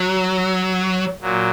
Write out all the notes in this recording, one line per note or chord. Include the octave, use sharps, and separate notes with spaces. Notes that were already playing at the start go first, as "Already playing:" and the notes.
Already playing: F#3
A#2 F#3